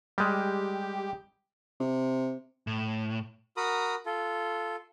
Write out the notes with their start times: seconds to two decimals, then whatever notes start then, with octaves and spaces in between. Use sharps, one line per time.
0.18 G3 G#3 G4
1.80 C3
2.67 A2
3.57 F#4 A#4 A#5 B5 D#6
4.06 F4 A4